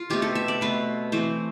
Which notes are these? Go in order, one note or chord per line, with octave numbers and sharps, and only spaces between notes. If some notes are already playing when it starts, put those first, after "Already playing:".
Already playing: F4
B2 A3 C4 G4
A4
E5
D5
B2 A3 C4 B4
E3 A3 C4 C5